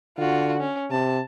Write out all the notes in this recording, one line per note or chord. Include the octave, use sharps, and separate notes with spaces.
D3 F4 F#4
C#4
C3 A5